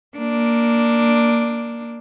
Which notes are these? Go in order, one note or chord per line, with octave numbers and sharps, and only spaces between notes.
A#3 D4